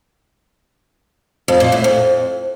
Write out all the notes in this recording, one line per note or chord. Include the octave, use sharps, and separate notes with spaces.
F2
A#2
A2
F2